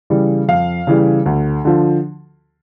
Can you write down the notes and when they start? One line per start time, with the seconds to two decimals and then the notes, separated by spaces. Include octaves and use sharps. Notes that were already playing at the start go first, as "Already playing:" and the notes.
0.10 C#3 E3 G3
0.48 F2 F5
0.87 C#3 E3 G3
1.26 D2
1.65 D3 F3